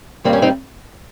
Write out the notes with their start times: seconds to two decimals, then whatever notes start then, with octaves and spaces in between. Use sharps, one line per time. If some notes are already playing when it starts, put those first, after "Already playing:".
0.24 G2 D#3 G3 A#3 C4
0.33 C#4
0.42 C4 D#4